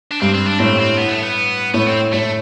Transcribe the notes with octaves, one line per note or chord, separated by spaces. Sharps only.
D4
G2 C4
C4
D4
A2 C4
C4
B3
A3
B3
A2 B3
C4
A2 A3